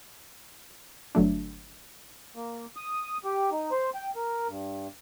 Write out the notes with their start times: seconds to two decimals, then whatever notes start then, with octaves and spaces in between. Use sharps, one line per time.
1.15 G1 F#3 A3 D4
2.36 A#3
2.76 D#6
3.25 G4
3.52 D#4
3.71 C5
3.95 G5
4.16 A#4
4.48 G2